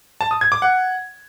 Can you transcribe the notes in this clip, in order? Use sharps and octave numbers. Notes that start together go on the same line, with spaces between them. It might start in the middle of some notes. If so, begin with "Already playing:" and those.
A5
D#6
G#6
D6
F#5